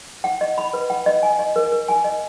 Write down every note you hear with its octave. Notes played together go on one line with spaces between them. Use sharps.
F#5
D#5
B5
B4
F#5
D#5
G#5
D#5
A#4
A#4
G#5
D#5